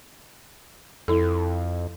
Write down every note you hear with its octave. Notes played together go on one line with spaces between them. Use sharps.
F2 E4 A4